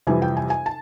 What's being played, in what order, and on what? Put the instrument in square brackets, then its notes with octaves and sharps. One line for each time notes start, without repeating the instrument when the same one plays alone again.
[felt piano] F2 C3 E3 G3 G#5
G5
G#5
G#5
A5